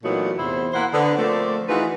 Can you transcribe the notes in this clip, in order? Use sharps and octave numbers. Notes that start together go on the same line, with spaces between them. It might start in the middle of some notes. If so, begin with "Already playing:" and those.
A#2 E3 F#3 A3 B3 D#4
E2 C3 E4 C5
A#3 E4 C5 F#5
D3 B3
F3 A3 A#3 C4 A4 D5
E3 D#4 F4 F#4 G#4 B4